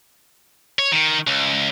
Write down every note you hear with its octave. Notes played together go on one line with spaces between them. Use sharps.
C#5
D#3
C#2